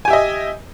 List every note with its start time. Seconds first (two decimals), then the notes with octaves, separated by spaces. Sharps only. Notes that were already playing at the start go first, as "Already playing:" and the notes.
0.05 G#5
0.08 G4
0.10 E5
0.13 D#5